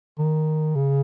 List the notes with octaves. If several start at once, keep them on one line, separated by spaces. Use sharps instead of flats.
D#3
C#3